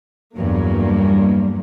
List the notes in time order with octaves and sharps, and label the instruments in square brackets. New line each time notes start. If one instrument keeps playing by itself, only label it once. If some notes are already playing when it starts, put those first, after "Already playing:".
[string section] E2 G2 F#3 A#3